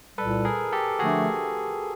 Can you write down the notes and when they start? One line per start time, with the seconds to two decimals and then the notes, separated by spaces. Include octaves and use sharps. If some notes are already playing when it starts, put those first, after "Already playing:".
0.18 C2 A#2 G3 A4 B4
0.45 G#4 A#4
0.73 G4 A4
0.99 D3 F3 A3 D4 F#4 G#4